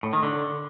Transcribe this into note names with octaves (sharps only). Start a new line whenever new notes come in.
A2
D#3
D3